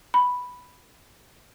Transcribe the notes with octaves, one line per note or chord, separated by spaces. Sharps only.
B5